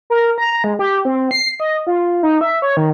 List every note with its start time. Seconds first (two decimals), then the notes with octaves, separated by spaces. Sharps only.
0.10 A#4
0.38 A#5
0.64 G#3
0.79 G4
1.05 C4
1.31 C7
1.60 D#5
1.87 F4
2.23 D#4
2.41 E5
2.62 C#5
2.77 D#3